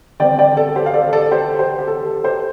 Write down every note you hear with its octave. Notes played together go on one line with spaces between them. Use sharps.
D3 G3 C4 D5 G5
D5 G5
A4
A4
G4 C5
F5
A4 D5
A4 D5
G4 C5
G4 C5
G4
A4
A4
G4 C5